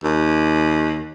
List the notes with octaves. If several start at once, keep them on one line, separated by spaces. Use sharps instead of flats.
D#2